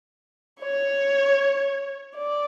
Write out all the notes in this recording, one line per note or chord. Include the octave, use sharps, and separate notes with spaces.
C#5
D5